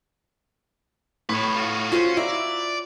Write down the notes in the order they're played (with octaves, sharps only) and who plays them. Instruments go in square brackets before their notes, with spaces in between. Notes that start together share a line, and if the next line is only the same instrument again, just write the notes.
[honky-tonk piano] A2 [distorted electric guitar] B4 C#5
[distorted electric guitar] F4 F#4
[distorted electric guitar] C#4 [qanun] F4 F#4 C5
[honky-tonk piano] E4 [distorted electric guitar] D5 [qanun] A#5